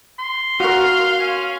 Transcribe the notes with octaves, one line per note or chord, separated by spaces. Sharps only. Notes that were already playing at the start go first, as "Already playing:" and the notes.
C6
F#4 A#4 F5
C#4